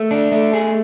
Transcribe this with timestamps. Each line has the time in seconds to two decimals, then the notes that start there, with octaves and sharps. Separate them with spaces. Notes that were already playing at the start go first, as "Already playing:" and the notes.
Already playing: A3
0.11 D4
0.32 A3
0.53 G#4